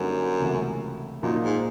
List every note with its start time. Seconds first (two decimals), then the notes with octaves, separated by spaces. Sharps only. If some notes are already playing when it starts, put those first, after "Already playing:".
Already playing: F#2 D3 G3 A#3 D#4
0.40 C#2 C3 E3 A3
1.22 F#2 A#2 F3 A#3 D#4
1.43 G#2